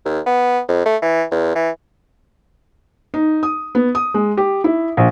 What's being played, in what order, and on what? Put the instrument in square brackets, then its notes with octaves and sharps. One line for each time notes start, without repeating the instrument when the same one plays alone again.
[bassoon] D#2
B3
F2
A3
E3
E2
E3
[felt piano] D#4
D#6
B3
D#6
G#3
G4
E4
A#1